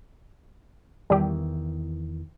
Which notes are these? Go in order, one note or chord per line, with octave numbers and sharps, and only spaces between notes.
E2 D#3 E3 G3 G4